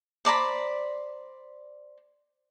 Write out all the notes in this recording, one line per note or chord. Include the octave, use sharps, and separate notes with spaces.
C5 D5 A#5 B5